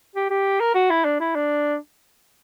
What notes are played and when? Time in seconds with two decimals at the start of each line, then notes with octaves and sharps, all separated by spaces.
0.15 G4
0.30 G4
0.60 A#4
0.75 F#4
0.90 E4
1.05 D4
1.20 E4
1.35 D4